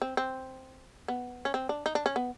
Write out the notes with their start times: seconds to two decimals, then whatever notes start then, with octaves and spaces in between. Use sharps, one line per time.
0.02 C4
0.17 C4
1.08 B3
1.45 C#4
1.54 C4
1.69 D4
1.86 D#4
1.95 D4
2.06 C#4
2.16 B3